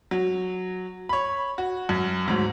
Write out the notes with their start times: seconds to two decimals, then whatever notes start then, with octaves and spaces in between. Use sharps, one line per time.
0.11 F#3
1.09 C#5 B5
1.58 F#4
1.89 F#2
2.26 D2 G#2 F#3